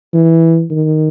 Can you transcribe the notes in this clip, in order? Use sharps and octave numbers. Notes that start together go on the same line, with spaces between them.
E3
D#3